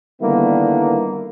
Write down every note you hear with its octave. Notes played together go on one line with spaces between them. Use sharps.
D3 D#3 G3 A#3 B3 E4